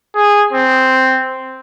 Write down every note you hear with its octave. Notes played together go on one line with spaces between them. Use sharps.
G#4
C4